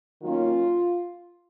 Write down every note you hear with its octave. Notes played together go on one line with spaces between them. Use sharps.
D#3 F#3 A#3 C#4 F4